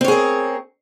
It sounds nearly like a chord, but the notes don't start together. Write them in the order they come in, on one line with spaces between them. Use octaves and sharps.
C4 C#5 G#4 A#4